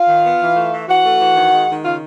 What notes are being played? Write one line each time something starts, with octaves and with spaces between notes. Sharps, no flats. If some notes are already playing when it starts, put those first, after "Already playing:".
Already playing: F4 F5
D#3
B3
E3
A3
E3
E3 F#4 F#5
A3
E3
D#3
G#3
D#3
C#3 F4 F5